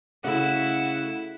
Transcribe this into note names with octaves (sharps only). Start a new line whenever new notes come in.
C#3 A3 E4 F#4